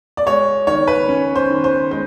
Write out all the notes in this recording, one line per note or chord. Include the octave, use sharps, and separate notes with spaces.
D5
G#3 C#5
D#3 C#5
B4
C#4
C5
D#3
C5
G#3 C5